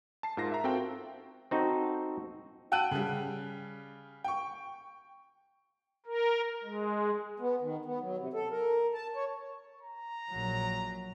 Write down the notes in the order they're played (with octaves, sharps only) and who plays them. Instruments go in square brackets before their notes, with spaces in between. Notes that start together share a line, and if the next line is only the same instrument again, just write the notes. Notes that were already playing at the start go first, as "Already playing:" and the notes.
[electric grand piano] A5 C7
G#2 F4 A#4 A5 A#6 C7
E5 A#5
C4 F#4 A4 A#4 F5 G5
[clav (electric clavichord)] C4 D#4 F#4 A4
[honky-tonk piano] F#5 G5 A5 E6 F#6 D#7
C#3 G3
G5 C#6
[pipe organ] A#4
G#3
[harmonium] B3
D#3
B3
F#3
C3
A4
A#4
A5
C#5
[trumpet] A#5
[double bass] A#1 F#3